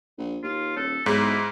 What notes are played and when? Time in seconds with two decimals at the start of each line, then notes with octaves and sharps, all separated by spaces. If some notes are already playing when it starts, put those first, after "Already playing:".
0.18 A#1
0.43 D#2 F4
0.77 D#1 A4 C#5
1.06 B1 G#2 E4 G#4 C#5